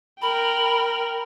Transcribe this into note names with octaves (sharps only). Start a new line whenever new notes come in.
A#4 G5 B5